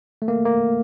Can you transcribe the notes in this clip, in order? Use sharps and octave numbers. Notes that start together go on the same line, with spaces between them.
A3
A#3
A#3